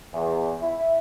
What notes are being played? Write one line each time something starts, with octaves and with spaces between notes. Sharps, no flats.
E2
E4